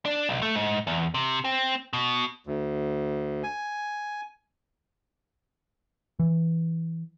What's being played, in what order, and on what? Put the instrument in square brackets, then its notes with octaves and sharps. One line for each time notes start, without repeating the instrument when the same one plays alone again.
[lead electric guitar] D4
B1
A3
G#2
E2
C3
C4
B2
[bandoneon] D2
G#5
[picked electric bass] E3